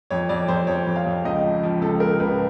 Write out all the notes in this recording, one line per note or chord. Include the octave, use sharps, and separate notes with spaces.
F2 C#5
F2 D5
F2 C5
F2 C#5
F2
F5
F2
C#2 D#5
F3
F3
C#2 A4
C#2 A#4
C#2 B4